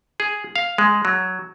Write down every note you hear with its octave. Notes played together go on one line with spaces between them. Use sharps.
G#4
F5
G#3
F#3